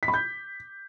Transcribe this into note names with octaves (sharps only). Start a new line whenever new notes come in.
B6
B5
G6